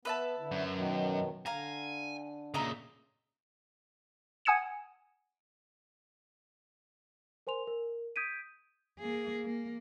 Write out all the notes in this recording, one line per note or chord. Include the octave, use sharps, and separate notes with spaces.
B3 B4 E5 A5
D3 E4
F#2
B2 D#3 F#3
D3 F5 G#5 A#5
A#2 C#3 D#5 E5 A#5
F#5 G#5 D#6 G#6 C#7 E7
A#4 C5 G#5 C6 F7
A#4
D#6 G6 G#6 B6 D7 D#7
A#3 G#4
A#3